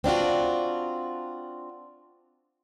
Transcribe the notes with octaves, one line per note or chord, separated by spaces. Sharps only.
C4 D4 F4 F#4